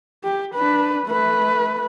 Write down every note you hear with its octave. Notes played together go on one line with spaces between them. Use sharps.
G4
D4 B4
A3 B4